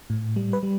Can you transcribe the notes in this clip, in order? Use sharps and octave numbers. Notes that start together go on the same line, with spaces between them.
A2
G3
B4
G3